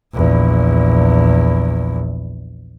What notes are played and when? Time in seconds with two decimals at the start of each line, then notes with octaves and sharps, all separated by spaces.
0.13 A#1 E2